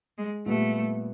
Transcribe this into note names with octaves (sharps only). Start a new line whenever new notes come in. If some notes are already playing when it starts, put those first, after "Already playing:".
G#3
A#2 G3 A3 B3